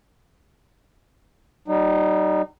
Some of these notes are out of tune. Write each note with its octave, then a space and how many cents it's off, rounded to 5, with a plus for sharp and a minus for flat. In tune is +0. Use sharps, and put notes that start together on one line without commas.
G3 -40 D#4 -25